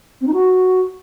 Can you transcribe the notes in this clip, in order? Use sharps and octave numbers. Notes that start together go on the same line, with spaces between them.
C4
D#4
F#4